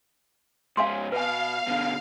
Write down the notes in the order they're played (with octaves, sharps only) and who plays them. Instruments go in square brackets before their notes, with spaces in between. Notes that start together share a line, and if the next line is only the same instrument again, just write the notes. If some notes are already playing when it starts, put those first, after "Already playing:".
[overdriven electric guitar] G#2 C#4 [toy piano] F5 G#5 C6
[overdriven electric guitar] B2 [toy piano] B4 G#5 [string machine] F5
[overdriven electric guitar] B2 D3